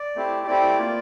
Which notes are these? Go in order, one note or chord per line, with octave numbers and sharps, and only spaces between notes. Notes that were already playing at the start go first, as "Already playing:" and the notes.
Already playing: D5
A3 C4 E4 G4
A3 C4 E4 G4 D5
A#3 F4